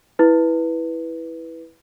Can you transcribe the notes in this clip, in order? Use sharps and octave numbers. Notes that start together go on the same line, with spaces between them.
E4 B4